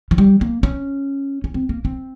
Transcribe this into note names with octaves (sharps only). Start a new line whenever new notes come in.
F3
G3
A#3
C#4
C#4
C4
A#3
C4